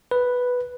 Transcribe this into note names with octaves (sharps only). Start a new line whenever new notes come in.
B4